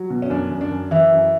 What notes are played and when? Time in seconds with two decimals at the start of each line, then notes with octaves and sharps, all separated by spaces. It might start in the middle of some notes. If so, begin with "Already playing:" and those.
Already playing: F#3
0.10 B2
0.22 C#4
0.30 F#2 D4
0.51 F#2
0.61 D4
0.71 F#2
0.91 E3 E4
1.12 F#2